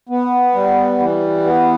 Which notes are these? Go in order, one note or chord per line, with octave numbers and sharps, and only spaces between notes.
B3
G3
E3
B3